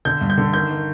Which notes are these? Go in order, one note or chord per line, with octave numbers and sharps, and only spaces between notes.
D3 G6
G2
G6
D3
D#3 G6
D#3